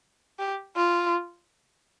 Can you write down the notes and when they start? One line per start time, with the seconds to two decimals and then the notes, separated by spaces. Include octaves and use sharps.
0.39 G4
0.76 F4